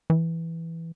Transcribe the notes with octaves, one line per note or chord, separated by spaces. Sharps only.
E3